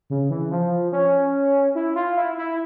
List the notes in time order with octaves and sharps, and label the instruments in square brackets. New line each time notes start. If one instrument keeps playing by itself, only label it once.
[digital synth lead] C#3
E3
F3
C#4
E4
F4
E4
E4